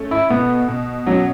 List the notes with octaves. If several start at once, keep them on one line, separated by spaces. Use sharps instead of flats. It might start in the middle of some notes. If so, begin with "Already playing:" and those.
Already playing: A3 C#4
E4
B2 B3
B2
F#3 C#4